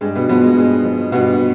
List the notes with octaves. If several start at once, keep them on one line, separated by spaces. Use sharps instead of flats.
G2 G#3
B2 B3
B2 F3 B3
G#3
G2 G#3
F3
G2 B2 B3